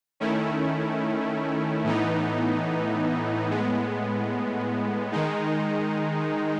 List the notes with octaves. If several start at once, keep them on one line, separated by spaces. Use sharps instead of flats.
D#3 A3 C#4 E4
A2 E3 B3 D#4
A2 G#3 B3
D#3 G#3 D#4